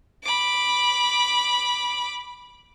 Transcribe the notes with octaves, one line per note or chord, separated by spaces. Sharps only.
B5 D6